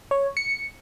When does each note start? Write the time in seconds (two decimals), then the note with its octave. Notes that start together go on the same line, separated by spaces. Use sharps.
0.11 C#5
0.37 C#7